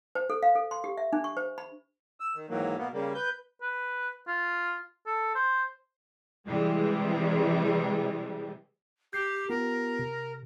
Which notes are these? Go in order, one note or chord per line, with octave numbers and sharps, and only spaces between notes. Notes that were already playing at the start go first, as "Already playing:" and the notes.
C5
A4
F5
A4
C6
G4
E5
D4
C#6
C5
B5
E6
D#3
G#2 D#3 E3 F#3 A#3
B2 A#3 B3
C#3 G3 A#3
B4 G6
B4
F4
A4
C5
C3 E3 G3 G#3
G4 G6 C7
B3 F4 G4 A#4
C3